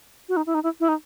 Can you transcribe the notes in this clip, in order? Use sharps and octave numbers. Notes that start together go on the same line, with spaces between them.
F#4
D#4
E4
D#4
E4
E4
D#4